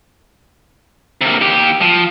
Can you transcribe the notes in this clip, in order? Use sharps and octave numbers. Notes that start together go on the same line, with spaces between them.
C3 A#3
D#2 G4
F3